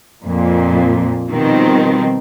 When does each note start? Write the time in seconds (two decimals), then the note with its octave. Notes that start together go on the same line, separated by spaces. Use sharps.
0.24 F2 A#2
1.29 B2 D#3 F3 G3 C4